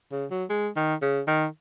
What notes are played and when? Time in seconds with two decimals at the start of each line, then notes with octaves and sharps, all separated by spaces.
0.12 C#3
0.31 F#3
0.50 G#3
0.76 D#3
1.02 C#3
1.27 D#3